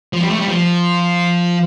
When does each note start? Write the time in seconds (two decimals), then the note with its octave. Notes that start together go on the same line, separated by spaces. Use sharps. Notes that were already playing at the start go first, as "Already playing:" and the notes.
0.13 F3
0.21 G3
0.31 A3
0.40 G3
0.48 F3